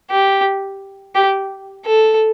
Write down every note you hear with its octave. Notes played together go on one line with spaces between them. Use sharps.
G4
G4
A4